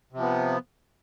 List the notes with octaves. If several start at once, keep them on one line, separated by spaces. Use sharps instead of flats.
C3 F3 B3